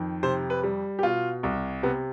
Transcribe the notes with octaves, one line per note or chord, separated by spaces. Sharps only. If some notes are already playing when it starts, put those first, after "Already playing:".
Already playing: F2 D#3
C3 C5
B4
G3
G4
B2 F4
C2
C3 B3